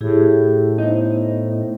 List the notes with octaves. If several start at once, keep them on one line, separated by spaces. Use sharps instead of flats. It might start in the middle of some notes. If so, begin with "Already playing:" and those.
A2 E4 G4 G#4
B3 D#4 E4 C5